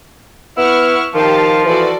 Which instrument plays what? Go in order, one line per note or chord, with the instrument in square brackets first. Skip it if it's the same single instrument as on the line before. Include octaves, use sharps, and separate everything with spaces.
[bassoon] B3 [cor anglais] E4 [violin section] F#5 C#6 F6
[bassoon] D#3 [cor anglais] F3 [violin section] G4 F5 A5
[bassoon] E3 [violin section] F#4 A4 D5